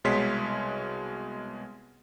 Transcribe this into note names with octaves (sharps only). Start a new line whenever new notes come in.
C2 B2 G#3 C#5 C6 B6